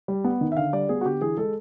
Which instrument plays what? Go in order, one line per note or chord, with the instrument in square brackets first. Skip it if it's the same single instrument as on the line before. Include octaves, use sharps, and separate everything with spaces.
[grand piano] G3
B3
D#3
E5
D3 F5
G3 D5
B3 G#4
F#4
D3 G4
E3 G#4
G#3 A4